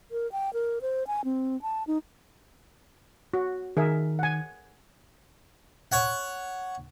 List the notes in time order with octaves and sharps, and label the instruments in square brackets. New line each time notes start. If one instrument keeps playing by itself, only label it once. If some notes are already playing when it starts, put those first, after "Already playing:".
[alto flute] A#4
G5
A#4
C5
G#5
C4
A5
D#4
[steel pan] F#4
[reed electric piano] D#3 [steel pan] G#4 A#4 E5
[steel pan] F#5 G#5
[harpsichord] C#5 F#5